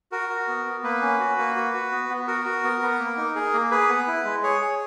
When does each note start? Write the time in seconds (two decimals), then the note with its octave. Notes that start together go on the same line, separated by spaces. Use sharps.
0.12 F#4 A#4
0.30 F#4
0.48 B3
0.66 B3
0.84 A#3 B4
1.02 C#4
1.20 F#4
1.38 A#3
1.56 F#4
1.74 F#4
1.92 B3
2.09 B3
2.27 F#4 A#4
2.45 F#4
2.64 B3
2.82 B3
2.99 A#3
3.17 D#4
3.35 G#4
3.53 A#3
3.71 G#4 B4
3.89 B3
4.07 E4
4.25 G#3
4.43 G#4 C#5
4.61 G#4